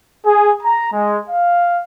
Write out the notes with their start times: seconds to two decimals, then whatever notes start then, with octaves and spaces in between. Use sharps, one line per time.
0.24 G#4
0.63 A#5
0.92 G#3
1.30 F5